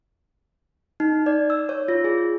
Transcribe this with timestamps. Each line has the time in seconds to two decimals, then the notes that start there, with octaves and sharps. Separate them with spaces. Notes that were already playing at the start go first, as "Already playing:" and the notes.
1.00 D#4
1.26 D5
1.50 E6
1.69 C#5
1.88 F4
2.04 G#4